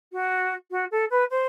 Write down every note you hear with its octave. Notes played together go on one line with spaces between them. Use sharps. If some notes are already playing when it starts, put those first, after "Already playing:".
F#4
F#4
A4
B4
C5